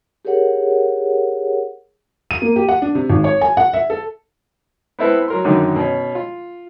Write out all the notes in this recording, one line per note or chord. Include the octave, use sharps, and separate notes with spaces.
G4 G#4 A#4 C#5 F#5
D#7
A#3
G4
F#5
D4
C3
G#1
C#5
G#5
F#5
E5
A4
B3 C4 E4 A4 B4
F#3 A#4 C6
F#2 D3 D#3 F#3 D#4
B2 C#4
F4